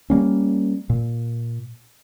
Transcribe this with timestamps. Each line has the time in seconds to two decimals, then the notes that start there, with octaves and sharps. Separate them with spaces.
0.10 G3 A#3 C#4
0.90 A#2